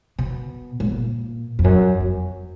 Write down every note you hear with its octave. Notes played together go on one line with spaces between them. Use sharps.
B2
G#2
A#2
F2
F#2
F2